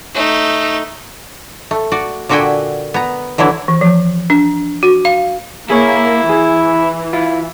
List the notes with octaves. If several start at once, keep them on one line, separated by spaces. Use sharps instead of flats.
A3 D#4
A3
F#4 D5
A#2 D3 F#4 E5 G5 G#5
B3 A#5
D3 E3 F#3 E4
E3
F3
D4
F#4
F5
A#3 E4 G#4 C#5
E3 G#4
E4 F4